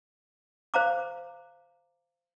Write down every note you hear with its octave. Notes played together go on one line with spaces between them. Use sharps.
C5 F5 A#5 D6